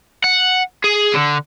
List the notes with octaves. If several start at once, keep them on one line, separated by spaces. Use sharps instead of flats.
F#5
G#4
D3